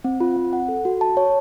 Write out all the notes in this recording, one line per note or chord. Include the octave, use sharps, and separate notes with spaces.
C4
F4
C4
F#5
A4
F#4
A5
C#5